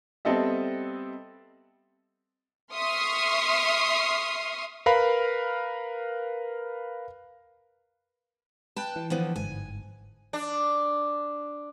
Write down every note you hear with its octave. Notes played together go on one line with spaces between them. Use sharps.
G3 B3 C4 A4 D#5 E5
E5 C6 C#6 D#6 F6 C7
A#4 B4 F5 B5
B4 G5 A5 F#6
E3
D3 F3 B3
G1 G#2 G#5
D4